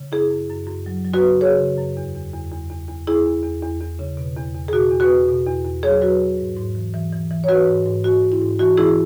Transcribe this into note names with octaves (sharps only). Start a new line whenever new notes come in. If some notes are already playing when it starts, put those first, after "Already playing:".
Already playing: C#3
F#2 E4 G#4
F#2
F#2
F#2
F#3
F#3
F#4 B4
C#3
C#3 G#4 C#5
C#3
F#2
E2
E2
E2
E2
E2
E2
E2 E4 G#4
E2
E2
E2
E2
C#3
B2
E2
E2
G#4
B2 F#4
E2
F#4 B4
E2
B2
E2
E2
F#3 G#4 C#5
F#3 F#4 B4
E2
G#2
G#2
E3
E3
E3
E3
C#5
E3 F#4 B4
G#2
G#2
G#2 F#4
G#2
E4
G#2
E3 F#4
E3 E4 G#4